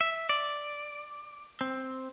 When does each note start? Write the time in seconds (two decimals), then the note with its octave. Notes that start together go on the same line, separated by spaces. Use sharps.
0.01 E5
0.29 D5
1.61 C4